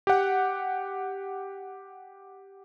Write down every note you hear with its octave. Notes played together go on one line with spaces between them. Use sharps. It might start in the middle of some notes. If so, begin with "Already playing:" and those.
G4 F#5